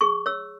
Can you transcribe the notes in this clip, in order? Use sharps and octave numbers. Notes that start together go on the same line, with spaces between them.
G#4 C#6
C#5 E6